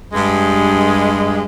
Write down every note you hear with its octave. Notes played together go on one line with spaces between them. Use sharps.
G2 G#3